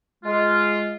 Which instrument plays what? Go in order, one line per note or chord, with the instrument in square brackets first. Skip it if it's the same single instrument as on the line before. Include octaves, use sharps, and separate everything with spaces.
[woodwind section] G#3 F4